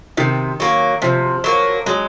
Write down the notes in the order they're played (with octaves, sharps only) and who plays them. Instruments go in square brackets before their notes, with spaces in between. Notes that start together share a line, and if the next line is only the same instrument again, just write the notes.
[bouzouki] C3 [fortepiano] D#3
[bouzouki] F#3 A#3
[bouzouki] C3 [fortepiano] F3
[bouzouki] F#3 A#3
[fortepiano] F#3 [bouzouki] G#3